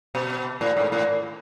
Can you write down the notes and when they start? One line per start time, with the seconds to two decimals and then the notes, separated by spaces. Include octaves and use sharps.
0.15 B2
0.61 A2
0.77 G#2
0.92 A2